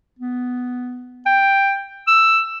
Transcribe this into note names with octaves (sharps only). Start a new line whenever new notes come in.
B3
G5
E6